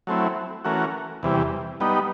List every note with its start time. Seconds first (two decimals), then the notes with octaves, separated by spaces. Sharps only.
0.07 F#3 A3 C4 E4
0.64 E3 A3 C#4 F#4 A#4
1.23 E2 C3 E3 G3
1.80 G3 B3 D#4